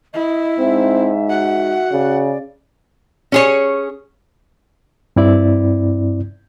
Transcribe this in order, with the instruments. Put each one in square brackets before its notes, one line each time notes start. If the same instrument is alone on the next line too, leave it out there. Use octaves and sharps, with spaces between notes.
[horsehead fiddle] E4 [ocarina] D#5
[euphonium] G#2 [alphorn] C4 [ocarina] E5
[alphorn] F#4 [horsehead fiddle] F#5
[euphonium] C#3 [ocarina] D5
[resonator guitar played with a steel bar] C#4 G#4 C#5
[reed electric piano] G2 C4 E4 D5